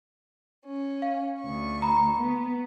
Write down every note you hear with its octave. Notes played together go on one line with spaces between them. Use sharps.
C#4
F5
D2 C#6
A#5 B5
B3